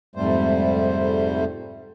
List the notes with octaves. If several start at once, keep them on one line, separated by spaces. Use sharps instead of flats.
F2 G#2 C3 G3 A3 C5